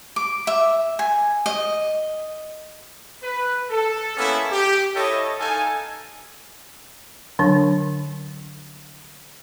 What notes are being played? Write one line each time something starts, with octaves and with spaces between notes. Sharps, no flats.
D6
E5
G#5
D#5
B4
A4
A#3 B3 C#4 E4 A4 E5
G4
E4 A4 C#5 D#5
D#4 A4 F5 G#5
D3 F#3 D4